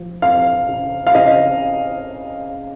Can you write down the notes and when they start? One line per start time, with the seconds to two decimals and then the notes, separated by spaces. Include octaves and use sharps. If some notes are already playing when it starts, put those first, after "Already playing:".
Already playing: F3
0.22 F2 F5
0.69 C#3
1.07 F5
1.15 C#3 D#5